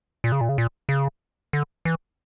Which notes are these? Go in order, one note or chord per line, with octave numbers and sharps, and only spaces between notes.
A#2
C#3
A#2
C#3
A#2
C#3
D3
E3